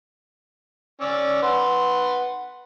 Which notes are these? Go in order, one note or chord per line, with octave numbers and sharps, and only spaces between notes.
C#4 D5 E6
B4 F#5 C6